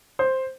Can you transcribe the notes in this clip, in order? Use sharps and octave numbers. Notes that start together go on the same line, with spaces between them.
C5